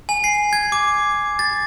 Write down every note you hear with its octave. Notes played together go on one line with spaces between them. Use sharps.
G#5
C7
G#6
D6
A6